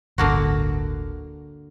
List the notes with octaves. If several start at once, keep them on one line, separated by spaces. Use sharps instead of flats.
D1 G1 D3 A#3 F#4